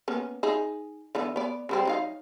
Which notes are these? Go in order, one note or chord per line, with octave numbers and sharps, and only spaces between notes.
A#3 B3 C#4
D#4 G#4
D3 E3 B3
B3 D5
C#3 G3 C4
F#3 D#4 F5